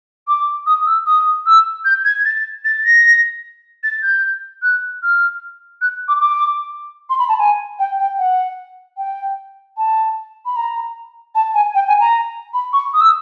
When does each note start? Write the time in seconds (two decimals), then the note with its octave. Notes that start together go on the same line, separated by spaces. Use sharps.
0.28 D6
0.67 D#6
0.86 E6
1.06 D#6
1.46 E6
1.85 G6
2.05 G#6
2.25 A6
2.65 A6
2.84 A#6
3.83 A6
4.02 G6
4.62 F#6
5.03 F6
5.81 F#6
6.08 D6
6.21 D6
7.10 C6
7.19 B5
7.29 A5
7.39 G#5
7.79 G5
7.99 G5
8.18 F#5
8.97 G5
9.77 A5
10.46 B5
10.56 A#5
11.35 A5
11.54 G#5
11.75 G5
11.88 G#5
12.00 A#5
12.54 B5
12.73 C#6
12.94 D#6
13.01 E6